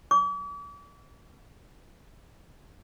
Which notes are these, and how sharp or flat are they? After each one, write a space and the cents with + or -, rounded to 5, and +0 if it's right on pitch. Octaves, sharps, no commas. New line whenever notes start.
D6 -45